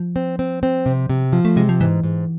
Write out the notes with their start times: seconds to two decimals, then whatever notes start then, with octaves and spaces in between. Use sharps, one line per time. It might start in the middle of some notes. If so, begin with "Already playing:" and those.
Already playing: F3
0.16 C4
0.39 C4
0.63 C4
0.86 C3
1.09 C3
1.33 F3
1.45 A3
1.56 C3 G#3
1.69 F3
1.80 G#2 E3
2.03 G#2